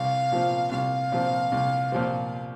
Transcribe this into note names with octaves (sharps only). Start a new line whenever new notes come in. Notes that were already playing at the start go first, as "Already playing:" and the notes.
Already playing: C2 F5
A#2 F3 C4
C2 F5
A#2 F3 C4
C2
A#2 F3 C4